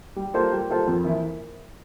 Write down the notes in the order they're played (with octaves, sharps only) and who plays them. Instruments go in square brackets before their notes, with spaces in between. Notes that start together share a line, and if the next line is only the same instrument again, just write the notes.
[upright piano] G3
A#3 F4 A4 C5
G3
A#3 F4 A4 C5
F2
E3 A#3 E4